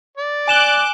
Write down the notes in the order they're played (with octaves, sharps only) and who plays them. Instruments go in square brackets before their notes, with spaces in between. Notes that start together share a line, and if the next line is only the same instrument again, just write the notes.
[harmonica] D5
[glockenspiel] G#5 E7 G7 [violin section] D6 F#6